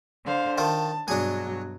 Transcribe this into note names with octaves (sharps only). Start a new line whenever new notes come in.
D3 C5 F5
D#3 F4 A5
G2 B2 F#3 D4 G#4